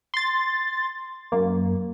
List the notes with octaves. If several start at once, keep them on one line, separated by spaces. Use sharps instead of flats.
C6 A6
F#2 A#3